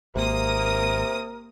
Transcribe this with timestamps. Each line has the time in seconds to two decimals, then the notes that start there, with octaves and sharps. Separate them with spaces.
0.15 G#1 C3 A#3 A#4 D#6